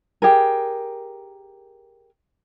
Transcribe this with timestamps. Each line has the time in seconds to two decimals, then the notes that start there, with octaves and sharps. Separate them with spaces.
0.22 G4 G#4 A#4